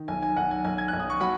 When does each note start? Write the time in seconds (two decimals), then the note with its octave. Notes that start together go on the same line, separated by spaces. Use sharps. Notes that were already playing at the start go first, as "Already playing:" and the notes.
Already playing: D#3
0.08 B1 G#5
0.22 G#5
0.36 B1 F#5
0.51 G#5
0.64 B1 G#5
0.78 G#6
0.88 B1 F#6
1.00 D#6
1.10 C#6
1.20 F#3 F#5 B5